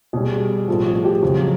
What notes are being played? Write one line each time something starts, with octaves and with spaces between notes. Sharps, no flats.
B2 G3 G#4
A2 F3 A4
G#4
G4
F2 C#3 F#3